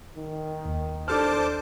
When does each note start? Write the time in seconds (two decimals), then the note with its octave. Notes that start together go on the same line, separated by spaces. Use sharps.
0.16 D#3
0.65 D#2
1.08 D4 A4 C5 A5 D6 F6